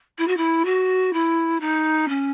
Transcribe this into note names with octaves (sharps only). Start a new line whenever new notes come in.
E4
F#4
E4
F#4
E4
D#4
C#4